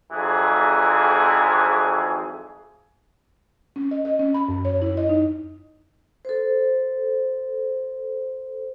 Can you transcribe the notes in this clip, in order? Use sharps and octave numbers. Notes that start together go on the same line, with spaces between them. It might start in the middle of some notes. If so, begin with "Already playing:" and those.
G#1 F2 E3 G#4
C#4
D#5
D#5
C#4
B5
F#2
C#5
E4
D#5
D#4
A4 C5